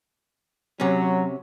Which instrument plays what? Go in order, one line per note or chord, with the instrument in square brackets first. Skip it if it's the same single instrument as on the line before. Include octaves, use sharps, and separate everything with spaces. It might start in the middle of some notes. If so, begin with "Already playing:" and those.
[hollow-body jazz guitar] C3 C#4 [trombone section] F#3